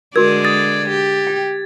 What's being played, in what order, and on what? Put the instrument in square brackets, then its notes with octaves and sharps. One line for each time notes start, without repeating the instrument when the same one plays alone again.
[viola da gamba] D3 G#3 D5 [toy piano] F#4 A#4 [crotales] G#6
[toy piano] D#6 [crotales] A6
[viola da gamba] G4
[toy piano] G5